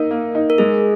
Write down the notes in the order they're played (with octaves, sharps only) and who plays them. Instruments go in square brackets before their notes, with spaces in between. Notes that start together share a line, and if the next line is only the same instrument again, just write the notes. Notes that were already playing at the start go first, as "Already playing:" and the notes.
Already playing: [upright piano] A#3 D#4 [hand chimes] A#4
[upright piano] A#3
D#4
[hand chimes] A#4
[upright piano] G#3 [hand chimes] G#4